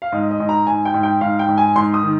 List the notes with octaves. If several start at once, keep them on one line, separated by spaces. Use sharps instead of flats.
F5
G#2 D#5
D#5
G#2
A#5
G#2 G#5
G5
G#2
G5
G#2 F5
G5
G#2
G#5
G#2 C6
D#6
D#3